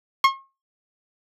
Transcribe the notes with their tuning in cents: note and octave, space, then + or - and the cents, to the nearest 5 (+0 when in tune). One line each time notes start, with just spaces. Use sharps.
C#6 -45